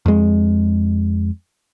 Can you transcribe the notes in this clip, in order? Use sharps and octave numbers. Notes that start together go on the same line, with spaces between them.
F2 G#3